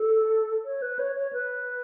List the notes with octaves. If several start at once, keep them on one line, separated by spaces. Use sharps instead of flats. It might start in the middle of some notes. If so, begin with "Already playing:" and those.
Already playing: A4
C#5
B4
C#5
C#5
B4